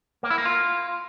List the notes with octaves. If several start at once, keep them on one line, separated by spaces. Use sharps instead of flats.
A#3
E4
A#3
F4